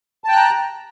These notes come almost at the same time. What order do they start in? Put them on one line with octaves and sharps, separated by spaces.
A5 G5 F#6 A#5